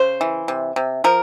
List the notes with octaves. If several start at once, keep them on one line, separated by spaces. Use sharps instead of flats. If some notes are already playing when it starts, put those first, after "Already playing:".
Already playing: C#3 C5
E3
C3
C3
F3 A#4